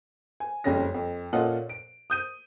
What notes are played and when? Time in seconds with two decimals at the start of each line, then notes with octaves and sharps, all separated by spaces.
0.40 G#5
0.64 F#1 F2 C#3 G3 C#4 A#6
0.94 F2
1.33 A#2 C#4 F4 A4 D#5 F#5
1.69 D7
2.10 D#6 G6 D#7